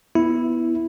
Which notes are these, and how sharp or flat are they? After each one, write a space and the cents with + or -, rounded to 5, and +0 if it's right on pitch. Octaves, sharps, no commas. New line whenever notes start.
B3 +0 E4 +0